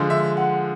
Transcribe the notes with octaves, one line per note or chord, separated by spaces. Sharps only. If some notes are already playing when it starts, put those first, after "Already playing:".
Already playing: D3 F3 G#3
E5
F#5